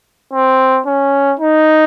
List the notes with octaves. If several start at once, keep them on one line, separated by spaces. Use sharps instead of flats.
C4
C#4
D#4